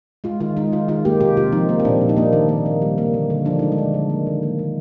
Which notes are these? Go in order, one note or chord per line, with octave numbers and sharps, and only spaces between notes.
G#3 F4
D#3 F4
G#3 D#4
D#3 F4
D#3 F4
A#3 G4
C3 G4
C3 F4
F3 D#4
A#3
C4
A#2 D4
A#2
D#4
A#3 D4
D#3
A#3
D#3
G3
A#3
D3
D3
F3 D4
G#3 D#4
D4
D3
D3
A#3
D#3
A#3
D#3